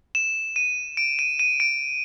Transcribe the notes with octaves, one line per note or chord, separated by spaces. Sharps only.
E7
D#7
D7
D#7
D#7
D7